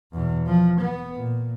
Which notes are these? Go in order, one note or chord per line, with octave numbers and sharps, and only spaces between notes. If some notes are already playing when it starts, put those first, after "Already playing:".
E2 B2
F3
B3
A#2